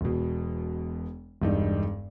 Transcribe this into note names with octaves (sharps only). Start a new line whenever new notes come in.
E1 B2
E1 G2 D#4